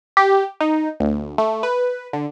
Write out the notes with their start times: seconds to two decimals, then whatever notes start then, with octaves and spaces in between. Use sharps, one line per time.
0.17 G4
0.61 D#4
1.00 D2
1.38 A3
1.63 B4
2.13 D3